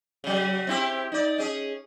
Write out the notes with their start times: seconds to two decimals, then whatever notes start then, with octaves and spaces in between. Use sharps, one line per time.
0.24 C#3 F#3
0.67 C4 E4 G4
1.12 D#4 D5
1.38 C#4 G#4